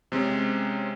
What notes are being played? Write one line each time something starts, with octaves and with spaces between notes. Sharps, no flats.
C3 G#3 C4 C#4